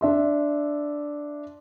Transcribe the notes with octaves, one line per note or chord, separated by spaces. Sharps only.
D4 E5 C6